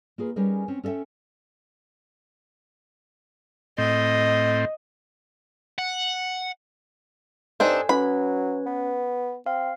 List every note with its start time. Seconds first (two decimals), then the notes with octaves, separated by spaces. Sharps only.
0.18 A#3 F4 G#4 B4
0.36 G3 C#4 D#4 G#4 A#4 B4
0.68 C4 C#4
0.84 C#4 A4 D5 E5 G5
3.78 A2 C4 D#5
5.78 F#5
7.60 G2 C4 D4 D#4 A4 G#5
7.89 F#3 C#4 B4 C#5 B5
8.66 B3
9.46 C4 F5